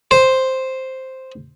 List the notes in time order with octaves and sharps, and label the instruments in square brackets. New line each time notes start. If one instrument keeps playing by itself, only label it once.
[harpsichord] C5